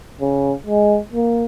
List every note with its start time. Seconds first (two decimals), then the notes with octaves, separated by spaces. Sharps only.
0.21 C#3
0.66 G#3
1.13 A#3